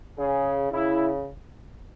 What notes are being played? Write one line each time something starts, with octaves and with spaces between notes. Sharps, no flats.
C#3 G#4
C#3 E4